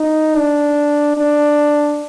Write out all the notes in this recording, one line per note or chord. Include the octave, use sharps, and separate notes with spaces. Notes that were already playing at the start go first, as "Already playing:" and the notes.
Already playing: D#4
D4
D4